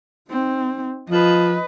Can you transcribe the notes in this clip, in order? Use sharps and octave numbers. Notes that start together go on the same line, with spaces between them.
C4 D#4
F3 B4 D#5